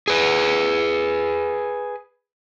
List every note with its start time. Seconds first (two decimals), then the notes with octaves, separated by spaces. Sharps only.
0.08 G#4 B4